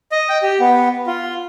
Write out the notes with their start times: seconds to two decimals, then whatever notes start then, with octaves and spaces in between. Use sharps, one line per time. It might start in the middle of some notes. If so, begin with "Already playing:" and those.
0.12 D#5
0.29 G5
0.43 G4
0.60 B3
1.07 F4